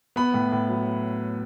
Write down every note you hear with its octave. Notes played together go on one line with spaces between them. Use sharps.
B3 B5
A2
A2
F#3